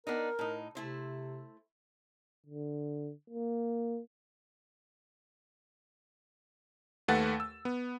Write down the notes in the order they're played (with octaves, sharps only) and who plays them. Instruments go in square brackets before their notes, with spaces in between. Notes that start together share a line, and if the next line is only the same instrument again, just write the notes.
[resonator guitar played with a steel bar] B3 D4 D#4 [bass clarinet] A#4
[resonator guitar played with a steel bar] A2 D#4
[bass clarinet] C3 [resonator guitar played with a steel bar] A3 E4 C5
[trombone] D3
A#3
[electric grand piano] D#2 A3 B4 F#5 A6
E6
B3